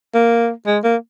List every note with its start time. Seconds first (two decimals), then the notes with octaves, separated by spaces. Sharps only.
0.14 A#3
0.66 G#3
0.84 A#3